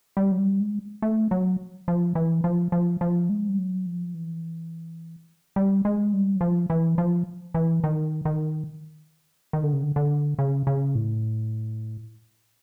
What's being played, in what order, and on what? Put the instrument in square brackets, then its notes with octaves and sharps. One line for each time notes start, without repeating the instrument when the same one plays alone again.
[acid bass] G3
F#3
G3
G#3
A3
F#3
F3
E3
F3
F3
F3
G#3
G3
F#3
F3
E3
G3
G#3
G3
F#3
F3
E3
F3
E3
D#3
D#3
D#3
D3
C#3
D3
D3
C#3
C#3
A2